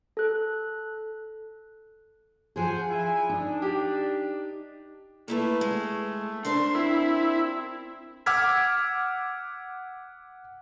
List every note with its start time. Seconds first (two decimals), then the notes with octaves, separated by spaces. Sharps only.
0.17 A4 F#6
2.56 F3 G#4 C5 F#5 G#5
2.89 E4 G#5
3.29 D4 D#4
3.62 G4
5.28 A3 A#3 E4 B4
5.61 G#3
6.45 D4 A#4 C5 C6
6.75 C4 E4
8.26 F#5 D6 E6 F6 G#6 B6